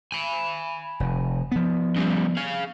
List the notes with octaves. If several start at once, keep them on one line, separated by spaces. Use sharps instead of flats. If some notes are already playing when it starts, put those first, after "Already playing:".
G#5 B5
F1
F3 B3
C#3 G3
G#4 F5